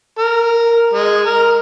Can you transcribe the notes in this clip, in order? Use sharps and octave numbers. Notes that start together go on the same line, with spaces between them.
A#4
G#3
A#4